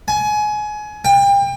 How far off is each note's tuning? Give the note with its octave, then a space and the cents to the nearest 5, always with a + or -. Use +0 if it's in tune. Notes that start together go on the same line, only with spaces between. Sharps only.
G#5 +25
G5 +30